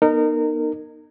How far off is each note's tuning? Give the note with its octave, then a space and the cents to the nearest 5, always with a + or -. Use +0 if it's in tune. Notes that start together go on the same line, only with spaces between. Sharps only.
B3 -30 D#4 -25 A#4 -25